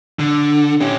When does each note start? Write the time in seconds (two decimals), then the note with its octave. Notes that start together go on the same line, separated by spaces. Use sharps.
0.19 D3
0.81 C#4 G4